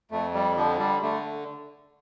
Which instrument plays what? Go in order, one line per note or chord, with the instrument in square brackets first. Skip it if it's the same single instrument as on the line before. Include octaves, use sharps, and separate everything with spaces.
[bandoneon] F2 A3
G3
D3 F3
G3
D3 A3